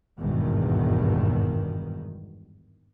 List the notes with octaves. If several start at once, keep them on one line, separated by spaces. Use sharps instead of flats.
G#1 E2 G2 B2 D#3